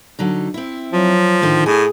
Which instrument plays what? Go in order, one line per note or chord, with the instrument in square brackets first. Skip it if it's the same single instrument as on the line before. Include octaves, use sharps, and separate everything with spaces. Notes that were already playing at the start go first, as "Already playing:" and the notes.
[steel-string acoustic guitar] D3 F#3 D#4
C4 E4
[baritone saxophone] F3 [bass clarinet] F#3
[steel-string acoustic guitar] A2 D3 D#4 [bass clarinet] D#3
[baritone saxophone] A2 [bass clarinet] G#4 [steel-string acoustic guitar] G#5